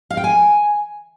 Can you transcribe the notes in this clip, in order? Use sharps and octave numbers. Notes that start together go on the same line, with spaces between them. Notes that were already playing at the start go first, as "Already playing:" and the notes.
F5
G5
G#5